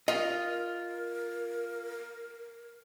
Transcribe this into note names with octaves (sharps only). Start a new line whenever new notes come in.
F4 A#4 D#5